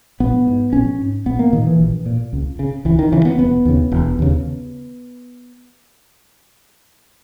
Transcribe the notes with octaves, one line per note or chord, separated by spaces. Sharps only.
A#1 B3
G#2
A#1 C#4
G#2
A#1 B3
A#3
A#2 D#3
E3
A#1
A#2
C#2
C#3
C#2 E3
D#3
C#3 E3
B3
E1 B3
D#2 C#3
E1
D#2 C#3